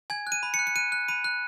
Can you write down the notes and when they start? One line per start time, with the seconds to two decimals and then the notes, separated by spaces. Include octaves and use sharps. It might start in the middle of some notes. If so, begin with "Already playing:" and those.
0.10 G#5 G#6
0.27 F#6
0.32 D#7
0.43 B5
0.54 C#7
0.59 F#6
0.67 C#7
0.76 F#6 D#7
0.92 F#6
1.08 B5 D#7
1.24 F#6